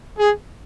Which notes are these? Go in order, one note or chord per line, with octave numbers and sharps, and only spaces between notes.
G#4